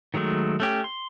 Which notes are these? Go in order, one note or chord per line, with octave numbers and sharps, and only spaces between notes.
D#3 F#3 G#3 A3
A3 C#4 G4
C6